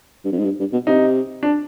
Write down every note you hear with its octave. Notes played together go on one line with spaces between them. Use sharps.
G2
F2
G#2
G2
G2
B2
C3 D#4
D4